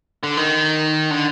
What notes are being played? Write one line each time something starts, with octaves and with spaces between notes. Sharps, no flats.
D3
D#3
D3